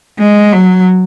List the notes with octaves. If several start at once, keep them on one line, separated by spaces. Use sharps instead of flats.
G#3
F#3